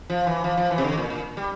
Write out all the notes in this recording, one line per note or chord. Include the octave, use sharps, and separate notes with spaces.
F3
E3
F3
F3
E3
C3
D3
A#2
A#2
G3